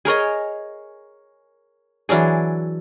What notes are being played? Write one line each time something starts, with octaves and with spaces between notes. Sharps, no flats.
G#4 A#4 C#5 D#5
E3 F#3 D4 G#4